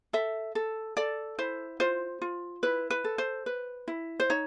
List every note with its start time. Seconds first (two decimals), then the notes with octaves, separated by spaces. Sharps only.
0.13 A4 E5
0.55 A4
0.97 A4 D5
1.39 E4 C5
1.80 F4 C5
2.22 F4
2.63 E4 B4
2.90 B4
3.04 A4
3.18 C5
3.46 B4
3.88 E4
4.20 C5
4.30 D#4 C#5